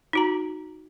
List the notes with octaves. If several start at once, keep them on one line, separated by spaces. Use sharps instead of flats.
D#4 F#4 A#5